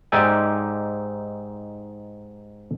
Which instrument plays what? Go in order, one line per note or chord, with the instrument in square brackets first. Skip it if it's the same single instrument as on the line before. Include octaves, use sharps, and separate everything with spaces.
[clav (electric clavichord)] G#2 D#4 G4 D5 E5 G#5